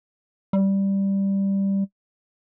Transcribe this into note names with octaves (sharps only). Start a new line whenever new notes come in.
G3